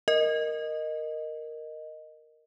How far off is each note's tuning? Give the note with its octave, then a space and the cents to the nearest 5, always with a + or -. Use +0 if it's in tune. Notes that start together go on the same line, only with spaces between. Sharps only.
A#4 +0 D#5 -5